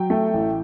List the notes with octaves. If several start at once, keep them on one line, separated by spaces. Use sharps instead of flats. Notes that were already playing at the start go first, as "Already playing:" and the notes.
Already playing: F#3 G5
A3
A1